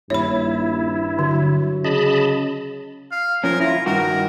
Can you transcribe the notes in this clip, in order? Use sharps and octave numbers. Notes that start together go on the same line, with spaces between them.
D#1 G2 E4 C#5 B5
D3 F#3
C#3 D#5 A5 B5
F5
F3 C#4 A#4
E4 F4 A#5
G2 D#3 F#4 A#4